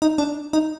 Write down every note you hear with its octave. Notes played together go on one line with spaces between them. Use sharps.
D#4
D4
D#4